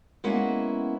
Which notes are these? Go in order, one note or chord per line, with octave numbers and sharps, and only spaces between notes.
G#3 A#3 B3 C#4 E4 F#4